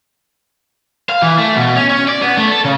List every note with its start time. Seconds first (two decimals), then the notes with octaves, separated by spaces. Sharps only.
1.09 F5
1.22 E3
1.38 A3
1.57 B2
1.76 C#4
1.89 C#4
2.08 D5
2.22 B3
2.38 A3
2.51 A4
2.64 C#3